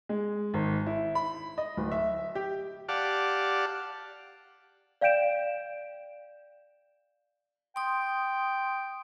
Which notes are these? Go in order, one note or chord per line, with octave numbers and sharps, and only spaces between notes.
G#3
G#1
E4
B5
D#5
D1
E5
G4
G4 D5 F5 F#5 A5
D5 F5 G5 G6 D7 E7
G5 C6 D#6